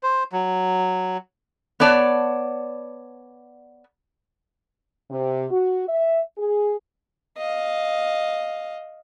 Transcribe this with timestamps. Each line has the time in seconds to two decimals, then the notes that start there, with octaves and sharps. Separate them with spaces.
0.03 C5
0.32 F#3
1.80 B3 C#5 D5 A5
5.10 C3
5.51 F#4
5.88 E5
6.38 G#4
7.37 D#5 F5